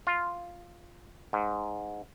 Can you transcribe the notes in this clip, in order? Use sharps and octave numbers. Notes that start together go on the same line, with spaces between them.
F4
G#2